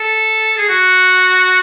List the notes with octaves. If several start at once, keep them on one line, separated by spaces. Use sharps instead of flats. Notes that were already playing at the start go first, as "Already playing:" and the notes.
Already playing: A4
G#4
F#4